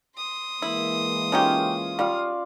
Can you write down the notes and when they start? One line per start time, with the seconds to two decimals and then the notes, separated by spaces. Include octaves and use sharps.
0.17 C6 D#6
0.62 E3 G#3 A#3 E4
1.32 C#3 C#4 D#4 F4 G4
1.99 G3 F4 D5 F5